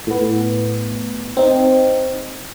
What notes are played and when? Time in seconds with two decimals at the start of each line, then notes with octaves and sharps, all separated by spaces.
0.07 A2 B3
1.37 C4 D#4